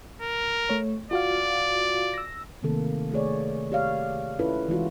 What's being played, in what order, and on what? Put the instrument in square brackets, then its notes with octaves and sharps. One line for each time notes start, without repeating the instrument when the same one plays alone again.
[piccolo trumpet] A#4
[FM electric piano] A3 C#5
[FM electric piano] F4 F#4 F5 [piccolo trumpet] D5
[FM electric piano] E6 A#6
[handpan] C3 D#3 A3 A#3 A4
A3 G#4 C#5 D5
G4 C#5 D5 F5
C#4 D4 E4 F4 A4 B4
E3 G#3 F4 F#4